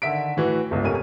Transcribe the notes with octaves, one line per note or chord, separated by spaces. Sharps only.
D3 D#3 E5 B6 D7
A2 E3 F#4
G1 C#2
F1 C#4 A#4 D#7